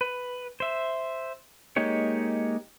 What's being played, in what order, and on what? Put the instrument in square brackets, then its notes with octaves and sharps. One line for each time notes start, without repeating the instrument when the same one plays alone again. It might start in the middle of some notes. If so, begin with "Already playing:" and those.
[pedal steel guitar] B4
C5 E5
G#3 A#3 D#4 G4 C#5